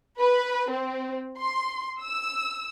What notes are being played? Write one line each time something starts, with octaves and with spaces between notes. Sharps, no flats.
B4
C4
C6
E6